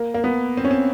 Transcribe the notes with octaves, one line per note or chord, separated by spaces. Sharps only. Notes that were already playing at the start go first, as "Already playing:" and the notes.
Already playing: A#3
A#3
B3
C4
C#4
C4